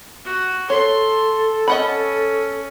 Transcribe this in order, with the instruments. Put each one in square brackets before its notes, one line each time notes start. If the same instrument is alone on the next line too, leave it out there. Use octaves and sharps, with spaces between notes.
[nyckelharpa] F#4
[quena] A4 [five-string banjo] C#5 [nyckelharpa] C6
[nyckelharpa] C#4 [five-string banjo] D#5 F#5 B5